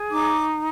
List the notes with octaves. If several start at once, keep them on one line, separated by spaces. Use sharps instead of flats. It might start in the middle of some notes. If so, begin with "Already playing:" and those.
Already playing: G#4
D#4 D6